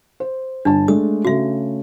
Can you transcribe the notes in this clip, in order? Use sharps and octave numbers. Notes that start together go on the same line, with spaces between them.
C5
G1 D4 A5
G#3 A3 D4 D#6
C#3 A3 F#4 E5